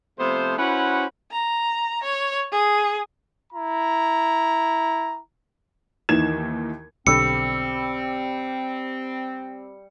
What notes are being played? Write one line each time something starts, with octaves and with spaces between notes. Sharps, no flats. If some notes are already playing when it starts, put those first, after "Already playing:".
C3 F3 A3 B3 C5
C#4 E4 F#4 B4 C5 F#5
A#5
C#5
G#4
E4 A#5
D#2 D#3 E3 D#4 G#6 E7
B1 D3 G3 C4 D6 E6 C#7